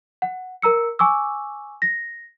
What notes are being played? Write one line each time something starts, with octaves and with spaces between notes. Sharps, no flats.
F#5
A#4 A#5 E6 C#7
G#5 C#6 D6 E6
A#6